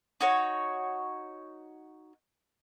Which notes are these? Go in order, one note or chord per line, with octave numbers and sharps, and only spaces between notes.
D#4 F#4 C#5